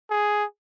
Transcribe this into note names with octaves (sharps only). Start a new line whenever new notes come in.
G#4